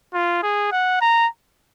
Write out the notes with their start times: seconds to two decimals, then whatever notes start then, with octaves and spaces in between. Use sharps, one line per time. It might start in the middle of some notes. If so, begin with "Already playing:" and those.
0.14 F4
0.43 G#4
0.72 F#5
1.01 A#5